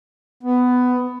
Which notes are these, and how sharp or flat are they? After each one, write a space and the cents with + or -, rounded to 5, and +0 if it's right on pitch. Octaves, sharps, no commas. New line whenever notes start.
B3 +15